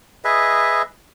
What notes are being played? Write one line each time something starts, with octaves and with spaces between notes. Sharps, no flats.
G#4 B4 D#5 E5